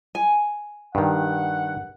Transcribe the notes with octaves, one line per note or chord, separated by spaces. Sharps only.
G#5
G2 D#3 F#5